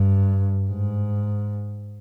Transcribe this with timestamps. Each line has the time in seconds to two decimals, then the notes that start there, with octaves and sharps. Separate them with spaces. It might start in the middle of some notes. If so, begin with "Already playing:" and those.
Already playing: G2
0.69 G#2